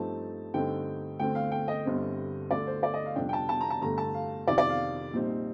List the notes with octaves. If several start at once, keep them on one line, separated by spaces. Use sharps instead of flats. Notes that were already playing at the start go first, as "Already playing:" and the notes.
Already playing: G2 F3 A3 C4 D#4 A5
G2 D3 A3 C4 D#4 G5
D2 D3 A3 C4 G5
F5
G5
D#5
G1 G2 D3 G3 C4
D2 D3 A3 D4 D5
C5
D5
D#5
F5
F2 C3 G3 D4 G5
G5
A5
A5
A#5
A5
G1 G2 D3 A3 A#5
A5
F5
F2 C3 D#3 D5
D5
F5
A#1 A#2 G3 C4 D#4